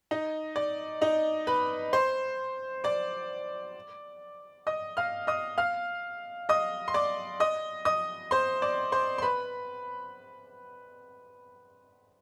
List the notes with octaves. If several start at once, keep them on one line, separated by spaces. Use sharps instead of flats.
D#4 D#5
D5
D#4 D#5
B4 B5
C5 C6
D5 D6
D#5 D#6
F5 F6
D#5 D#6
F5 F6
D#5 D#6
C6
D5 D6
D#5 D#6
D#5 D#6
C5 C6
D5 D6
C5 C6
C6
B4 B5